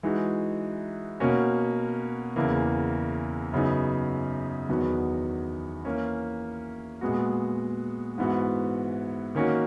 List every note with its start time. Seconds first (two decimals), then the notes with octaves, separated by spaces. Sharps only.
0.03 E3 G#3 D#4 F#4
1.20 B2 A#3 C#4 F#4
2.36 E2 C#3 E3 A#3
3.52 F#2 C#3 F#3 B3 D#4
4.69 E2 D#3 F#3 B3 F#4
5.85 E3 A#3 C#4
7.01 A#2 G#3 B3 F#4
8.18 G#2 E3 B3 F#4
9.35 D#3 A#3 C#4 F#4